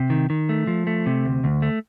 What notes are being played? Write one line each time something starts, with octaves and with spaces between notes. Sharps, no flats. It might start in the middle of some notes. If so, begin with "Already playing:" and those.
Already playing: C3
D#3
D#3
A3
F3
A3
C3
D2
D2
A3